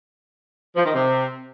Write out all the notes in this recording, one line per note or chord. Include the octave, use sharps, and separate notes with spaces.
F3
D#3
C3